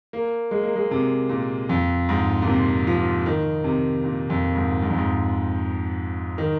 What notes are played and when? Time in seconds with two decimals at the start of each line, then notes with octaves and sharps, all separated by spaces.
0.13 A#3
0.51 G#3
0.63 A#3
0.76 G#3
0.91 C3
1.29 A#2
1.69 F2
2.09 G#2
2.42 A#2
2.47 C3
2.87 F3
3.26 D#3
3.64 C3
4.04 A#2
4.30 F2
4.55 G#2
4.82 G#2
4.90 F2
4.98 G#2
6.38 D#3